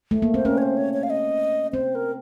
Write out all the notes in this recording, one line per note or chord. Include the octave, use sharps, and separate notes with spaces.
A3
A#3
C4 C5
C#4 A#4
C#5
C5
C#5
C#5
F5
D#5
C4 C5
A#4